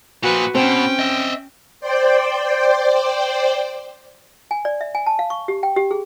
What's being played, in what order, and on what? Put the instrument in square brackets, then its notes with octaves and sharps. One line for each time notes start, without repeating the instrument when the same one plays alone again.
[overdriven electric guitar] A#2 F3 [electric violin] F#4 B4
[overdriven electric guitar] B2 [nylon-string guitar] C4 [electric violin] C#4 G5
[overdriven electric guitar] D#5 E5
[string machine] C5 D5 G5
[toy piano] G#5
D5
E5
G#5
A5
F5
C#6
G4
G5
G4
G#4